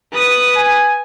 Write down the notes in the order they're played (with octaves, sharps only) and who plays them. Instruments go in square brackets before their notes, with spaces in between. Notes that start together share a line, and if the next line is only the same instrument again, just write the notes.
[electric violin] B4 D#6
[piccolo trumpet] G#5